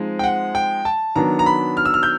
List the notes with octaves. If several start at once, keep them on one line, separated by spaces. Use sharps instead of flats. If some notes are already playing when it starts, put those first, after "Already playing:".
Already playing: F3 G#3 C4 D#4
G5
F#5
G5
A5
D#3 F#3 B3 D4 A#5
A#5
B5
F6
E6
F6
G6